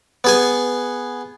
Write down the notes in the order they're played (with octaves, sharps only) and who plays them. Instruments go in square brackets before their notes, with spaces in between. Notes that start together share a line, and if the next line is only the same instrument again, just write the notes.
[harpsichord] B3 G#4 G#5